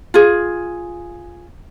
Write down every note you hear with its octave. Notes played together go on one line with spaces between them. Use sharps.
F4 G#4